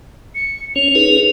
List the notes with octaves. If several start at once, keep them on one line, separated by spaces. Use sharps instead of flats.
C#7
C#4 C#5 F7
D#4 G#4 B4